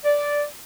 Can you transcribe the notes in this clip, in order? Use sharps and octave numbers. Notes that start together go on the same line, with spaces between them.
D5